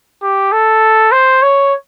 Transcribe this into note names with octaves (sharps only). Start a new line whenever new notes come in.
G4
A4
C5
C#5